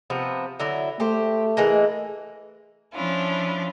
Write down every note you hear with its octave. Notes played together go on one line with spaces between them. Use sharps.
C3 F3 B3
D3 F#3 E4
A3 G4 C5
E3 G#3 A#3
F3 C#4 D4 E4 F4